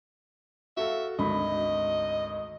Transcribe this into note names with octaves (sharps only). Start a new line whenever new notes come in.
F#4 A4 E5 F5
G#1 D2 D#5 B5